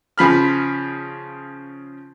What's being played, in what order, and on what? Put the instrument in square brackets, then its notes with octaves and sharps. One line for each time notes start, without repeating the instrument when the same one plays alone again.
[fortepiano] C#3 F3 B5 F6